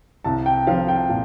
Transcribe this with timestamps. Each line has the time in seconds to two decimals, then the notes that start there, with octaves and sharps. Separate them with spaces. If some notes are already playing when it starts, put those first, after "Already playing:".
0.24 C2 A5
0.46 G5
0.67 F3 F5
0.88 G5
1.09 A#2